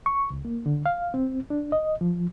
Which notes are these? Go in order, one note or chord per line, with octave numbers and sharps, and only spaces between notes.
C#6
C#2
A#3
D3
F5
C4
D4
D#5
F3